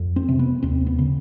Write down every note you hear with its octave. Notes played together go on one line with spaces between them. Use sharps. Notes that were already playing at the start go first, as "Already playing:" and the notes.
Already playing: F2
C4
C3
B3
D#2 C4
B3
C#3